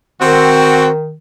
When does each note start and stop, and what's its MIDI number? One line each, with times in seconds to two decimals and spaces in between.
0.21 1.17 51
0.21 0.88 60
0.21 0.88 66